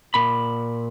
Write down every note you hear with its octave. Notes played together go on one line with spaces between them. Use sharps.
A#2 B5